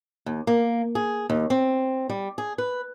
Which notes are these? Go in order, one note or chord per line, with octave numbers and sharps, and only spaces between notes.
D#2
A#3
G#4
D#2
C4
G3
G#4
B4